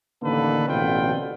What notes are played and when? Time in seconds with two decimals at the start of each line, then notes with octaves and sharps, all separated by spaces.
0.22 A1 D3 D#3 A#3 A4 B4
0.68 A1 B2 D3 C4 F4 G5